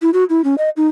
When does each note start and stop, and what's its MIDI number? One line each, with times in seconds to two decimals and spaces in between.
0.02 0.10 64
0.14 0.24 66
0.30 0.41 64
0.44 0.55 61
0.58 0.70 75
0.77 0.87 63